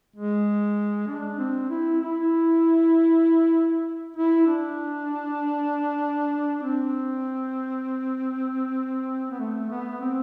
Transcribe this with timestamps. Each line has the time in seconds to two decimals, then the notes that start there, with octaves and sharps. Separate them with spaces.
0.16 G#3
1.08 D4
1.39 C4
1.70 E4
2.01 E4
4.16 E4
4.47 D4
6.63 C4
9.31 B3
9.40 A3
9.70 B3
10.01 C4